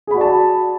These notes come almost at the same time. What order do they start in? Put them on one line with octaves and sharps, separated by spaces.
G#4 B5 F#4 D5 A5